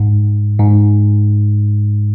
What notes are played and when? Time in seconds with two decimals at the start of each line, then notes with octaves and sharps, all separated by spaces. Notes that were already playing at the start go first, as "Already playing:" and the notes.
Already playing: G#2
0.59 G#2